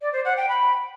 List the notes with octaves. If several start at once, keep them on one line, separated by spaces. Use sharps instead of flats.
D5
C5
F#5
G5
B5